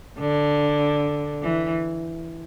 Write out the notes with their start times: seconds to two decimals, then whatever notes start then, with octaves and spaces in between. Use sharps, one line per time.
0.19 D3
1.42 E3